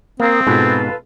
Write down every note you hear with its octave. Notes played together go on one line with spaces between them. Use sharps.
A#3 C4 A#4 F5 D#6
G#2 B2 F4 A4 B4